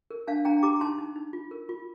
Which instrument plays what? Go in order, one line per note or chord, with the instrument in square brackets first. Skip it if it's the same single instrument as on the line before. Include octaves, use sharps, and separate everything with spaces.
[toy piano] A#4
D4 F5 A5
D4 G5 A#5
G4 A#5 D6
D#4 A5 C6
D#4
D#4
F4
A#4
F4